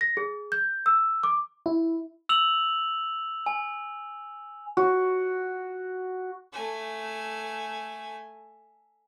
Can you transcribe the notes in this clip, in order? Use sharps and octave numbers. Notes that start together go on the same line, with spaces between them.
A#6
G#4
G6
E6
D6
E4
E6 F7 F#7
G#5
F#4
A3 G#5